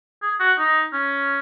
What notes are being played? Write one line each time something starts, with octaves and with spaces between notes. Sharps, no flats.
G#4
F#4
D#4
C#4